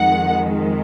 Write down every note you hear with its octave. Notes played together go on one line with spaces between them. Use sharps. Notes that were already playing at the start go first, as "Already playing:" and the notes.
Already playing: F2 D#3 G#3 F#5